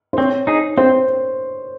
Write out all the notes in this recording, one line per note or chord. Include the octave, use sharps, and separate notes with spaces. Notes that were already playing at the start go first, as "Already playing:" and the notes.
C5
C4 C#5
D#4 G#4
C4 C5